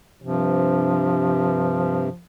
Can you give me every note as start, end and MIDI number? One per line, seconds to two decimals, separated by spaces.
0.22 2.09 43
0.22 2.09 48
0.22 2.23 53